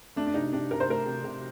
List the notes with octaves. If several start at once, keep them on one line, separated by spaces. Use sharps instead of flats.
A3 D4
D4
C3 D#4
C3 D4
C3 A#4
C5
A3 A#4
C3
C3